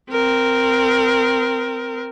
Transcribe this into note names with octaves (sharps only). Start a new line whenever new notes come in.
C4 A#4